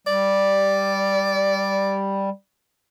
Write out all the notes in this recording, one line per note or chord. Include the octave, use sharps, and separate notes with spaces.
G3 D5